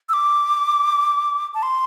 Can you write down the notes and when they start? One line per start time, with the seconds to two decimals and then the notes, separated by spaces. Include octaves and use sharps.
0.09 E6
0.13 D6
1.54 A5
1.63 C6